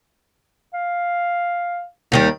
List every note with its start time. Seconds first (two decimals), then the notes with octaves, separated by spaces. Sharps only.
0.74 F5
2.12 D#2 D#3 G3